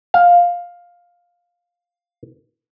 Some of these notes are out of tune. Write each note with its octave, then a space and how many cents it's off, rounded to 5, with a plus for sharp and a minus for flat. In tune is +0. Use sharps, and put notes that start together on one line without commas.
F5 +10